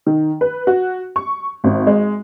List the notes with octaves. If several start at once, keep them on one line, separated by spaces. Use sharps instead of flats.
D#3
B4
F#4
C#6
G#1
G#3